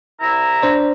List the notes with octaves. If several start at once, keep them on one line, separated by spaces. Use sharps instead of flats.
C2 E4 A#5
D4 C5 D5